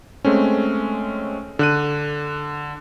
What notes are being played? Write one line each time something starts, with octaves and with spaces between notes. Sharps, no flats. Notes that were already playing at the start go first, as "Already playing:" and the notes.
G#3 A3 C4 C#4
D3 F#6 D#7